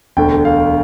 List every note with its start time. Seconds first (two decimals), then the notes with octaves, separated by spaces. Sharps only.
0.17 E1 D2 D3 G5
0.45 F5